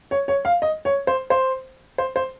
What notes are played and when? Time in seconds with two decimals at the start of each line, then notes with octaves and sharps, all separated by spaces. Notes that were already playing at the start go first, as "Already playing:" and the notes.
0.11 C#5
0.28 C#5
0.45 F5
0.62 D#5
0.85 C#5
1.07 C5
1.30 C5
1.98 C5
2.16 C5